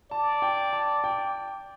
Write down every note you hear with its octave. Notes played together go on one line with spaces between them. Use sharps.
D5 A5
G5
A5
G5